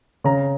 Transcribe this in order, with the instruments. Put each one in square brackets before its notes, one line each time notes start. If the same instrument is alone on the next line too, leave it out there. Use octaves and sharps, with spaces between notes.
[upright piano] C#3 A#5